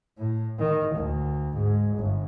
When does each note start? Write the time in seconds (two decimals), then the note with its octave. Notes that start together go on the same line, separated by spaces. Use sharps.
0.18 A2
0.59 D#3
0.95 D2
1.54 G#2
1.97 G1